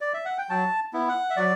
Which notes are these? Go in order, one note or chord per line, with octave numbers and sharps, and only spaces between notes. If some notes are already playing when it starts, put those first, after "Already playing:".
D5
E5
F#5
G5
F#3 A5
B3 E4
F#5
E5
F#3 D5